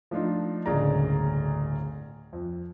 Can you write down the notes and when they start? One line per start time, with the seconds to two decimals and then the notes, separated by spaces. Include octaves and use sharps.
0.11 F3 A3 D4 D#4 F4
0.66 D1 G1 C#3 A#3 D5 A#5
2.33 F2